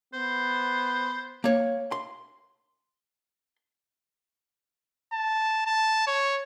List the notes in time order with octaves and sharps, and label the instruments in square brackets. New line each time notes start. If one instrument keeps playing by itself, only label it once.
[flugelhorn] B3 [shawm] C5
[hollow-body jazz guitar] A#3 C#5
C6
[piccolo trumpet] A5
A5
C#5